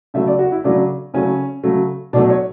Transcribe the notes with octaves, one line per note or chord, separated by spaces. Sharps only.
C#3 F#3 A3 E5
D5
F#4
E4
C#3 F#3 A3 D4
C#3 F#3 A3 C#4
C#3 F#3 A3
B2 F#3 A3 D4
C#5